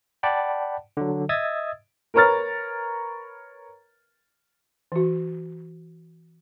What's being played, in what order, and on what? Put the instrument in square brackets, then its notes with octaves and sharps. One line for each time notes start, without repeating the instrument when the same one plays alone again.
[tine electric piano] D5 F#5 G5 A5 B5
D3 F#3
D#5 E5 D#6 E6 G#6 A6
[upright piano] A#4 B4 C#5 A#5 F6 A6
[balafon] E3 F#4